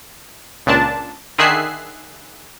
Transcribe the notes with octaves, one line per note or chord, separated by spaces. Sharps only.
C#2 A#2 D4 A5
D3 D#3 G#4 E5 F#6 C7